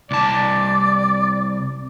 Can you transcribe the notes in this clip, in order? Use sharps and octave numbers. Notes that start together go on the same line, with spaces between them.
C2 D5 A5